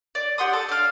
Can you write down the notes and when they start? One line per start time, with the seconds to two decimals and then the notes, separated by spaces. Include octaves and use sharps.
0.15 D5
0.38 G4 F#5 C6 D#6
0.53 A4
0.69 D4 F5